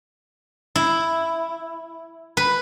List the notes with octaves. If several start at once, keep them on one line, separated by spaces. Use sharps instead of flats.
E4
B4